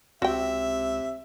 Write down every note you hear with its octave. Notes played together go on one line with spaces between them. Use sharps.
C#2 C3 F#4 E5 G5